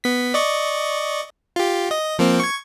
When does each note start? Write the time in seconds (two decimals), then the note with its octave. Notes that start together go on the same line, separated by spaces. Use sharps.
0.04 B3 B6
0.34 D5 D#5 C#6
1.56 F4 G4
1.91 D#5
2.19 F3 A#3 C4
2.40 C#6 G#6